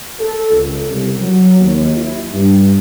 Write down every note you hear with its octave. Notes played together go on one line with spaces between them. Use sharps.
A4
C#2
C2
F#3
D#2
E4
G2